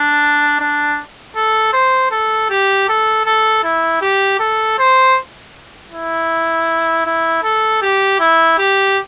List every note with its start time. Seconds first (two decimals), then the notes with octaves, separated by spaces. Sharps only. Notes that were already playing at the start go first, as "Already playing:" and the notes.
Already playing: D4
0.60 D4
1.36 A4
1.73 C5
2.11 A4
2.50 G4
2.88 A4
3.26 A4
3.64 E4
4.02 G4
4.40 A4
4.78 C5
5.91 E4
7.06 E4
7.43 A4
7.82 G4
8.20 E4
8.58 G4